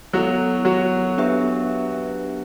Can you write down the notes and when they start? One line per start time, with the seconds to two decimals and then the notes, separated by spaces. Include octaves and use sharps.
0.13 F#3 B3 E4 F#4 A4
0.65 F#3 F#4
1.18 B3 D4 G4 B4 E5